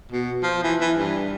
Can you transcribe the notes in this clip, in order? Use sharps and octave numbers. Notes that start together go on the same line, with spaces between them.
B2
F3
E3
E3
G2